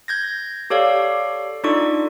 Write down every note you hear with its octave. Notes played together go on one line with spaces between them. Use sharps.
G6 G#6 A#6
G4 A4 C#5 D5 F5
D4 D#4 F4 A4 D5 C#6